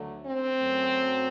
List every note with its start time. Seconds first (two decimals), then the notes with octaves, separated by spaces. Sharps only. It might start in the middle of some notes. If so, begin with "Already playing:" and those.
Already playing: D2 D3 F#3 A3
0.24 C4
0.59 F#2 F#3 A3